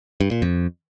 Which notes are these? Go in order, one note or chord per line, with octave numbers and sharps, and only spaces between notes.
G2
A#2
F2